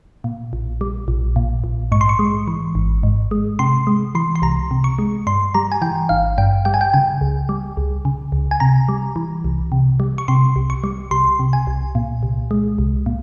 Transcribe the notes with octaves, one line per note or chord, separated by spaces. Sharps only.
A#2
A#1
G3
A#1
A#2
A#1
G#2 C#6
C6
C#6
G#3
E3
G#1
G#2
G#3
C3 C6
G#3
E3 C6
C6
C2 A#5
C3
C#6
G#3
G2 C6
G3 A#5
G#5
E3 G5
G#1 F5
G2 G5
G3 G5
G#5
G5
C#3 G#5
C#2
G3
C#2
C#3
C#2
G#5
C3 A#5
G3
E3
C2
C3
G3
C#6
C3 C6
C2
C#6
G3
C2 C6
C3
G#5
C2
A#2
C2
G#3
C2
A#2